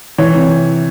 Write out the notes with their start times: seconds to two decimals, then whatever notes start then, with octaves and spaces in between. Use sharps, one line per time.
0.18 E3 C#5
0.34 C3